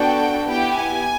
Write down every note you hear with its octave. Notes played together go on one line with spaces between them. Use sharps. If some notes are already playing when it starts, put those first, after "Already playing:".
Already playing: B3 D4 F#4 A4 G5
B3 E4 G4 G5
G#5